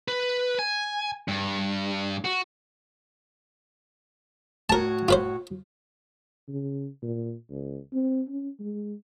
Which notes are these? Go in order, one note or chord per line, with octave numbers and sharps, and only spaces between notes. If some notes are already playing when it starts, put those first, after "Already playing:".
B4
G#5
G2
F#4
A2 F#4 A#4 C#5 A5
F4 B4 C5
C#3
A#2
C#2
C4
C#4
G#3